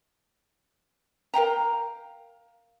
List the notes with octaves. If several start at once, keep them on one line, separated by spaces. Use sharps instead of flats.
A#4 F5 G5 A#5